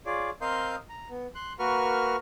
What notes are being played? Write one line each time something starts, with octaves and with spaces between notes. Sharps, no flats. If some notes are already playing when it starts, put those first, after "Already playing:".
F4 G#4 C#5 D5
C4 A#4 D#5 F5 C6 G6
A#5
B3
C6 F#6
A#3 F#4 A#4 B4 C#6 F6